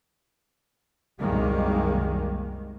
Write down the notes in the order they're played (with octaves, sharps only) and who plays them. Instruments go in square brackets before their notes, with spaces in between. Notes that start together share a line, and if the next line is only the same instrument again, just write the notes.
[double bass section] C2 F#2 D#3 G3 G#3 A#3